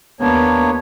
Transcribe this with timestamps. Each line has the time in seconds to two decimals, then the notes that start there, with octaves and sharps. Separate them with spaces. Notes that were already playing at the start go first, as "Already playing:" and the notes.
0.21 D#2 A#3 B3 D4 C#5